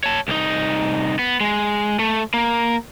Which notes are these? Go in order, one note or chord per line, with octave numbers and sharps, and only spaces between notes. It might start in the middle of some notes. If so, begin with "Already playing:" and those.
C#5 A5
C2 D#4
B3
G#3
A3
A#3